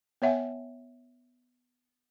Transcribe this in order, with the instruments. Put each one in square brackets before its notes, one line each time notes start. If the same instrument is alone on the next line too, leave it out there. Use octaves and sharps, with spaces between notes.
[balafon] B3 C#5 E5 F#5 G#5